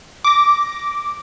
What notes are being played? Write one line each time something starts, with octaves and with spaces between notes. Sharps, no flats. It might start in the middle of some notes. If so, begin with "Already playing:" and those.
D6 A#6